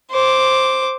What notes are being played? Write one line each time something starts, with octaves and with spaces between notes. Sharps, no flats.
C5 D6